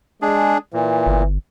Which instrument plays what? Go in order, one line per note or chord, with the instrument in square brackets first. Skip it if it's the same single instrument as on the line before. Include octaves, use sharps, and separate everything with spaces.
[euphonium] G#3 [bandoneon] D4 G#4
[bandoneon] A#2 [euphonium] E3
[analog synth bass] G1